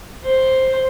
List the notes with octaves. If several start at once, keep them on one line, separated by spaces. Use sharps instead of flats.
C5